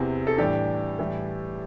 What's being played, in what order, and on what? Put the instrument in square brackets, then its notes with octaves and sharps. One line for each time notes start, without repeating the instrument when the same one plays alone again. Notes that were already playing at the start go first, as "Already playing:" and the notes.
Already playing: [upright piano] E2 C3 E3 C4
A4
A2 E3 G3 D4 G4
A2 E3 G3